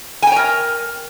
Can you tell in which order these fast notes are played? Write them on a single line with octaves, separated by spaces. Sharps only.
G#5 G5 C#5 A#4